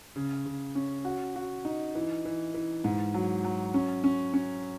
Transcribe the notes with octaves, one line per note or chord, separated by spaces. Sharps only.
C#3
C#3
C#4
F#4
F#4
D#4
E3
E3
E3
G#2
F#3
F#3
C#4
C#4
C#4